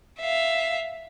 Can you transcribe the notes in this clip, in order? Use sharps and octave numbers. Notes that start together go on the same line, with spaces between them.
E5 F5